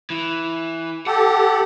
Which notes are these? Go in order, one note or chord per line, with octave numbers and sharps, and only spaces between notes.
E3
G4 A4 F#5